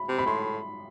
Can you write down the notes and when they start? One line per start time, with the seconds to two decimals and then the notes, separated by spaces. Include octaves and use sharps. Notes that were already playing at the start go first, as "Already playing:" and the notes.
Already playing: B5
0.09 C3
0.19 B5
0.26 A2 C6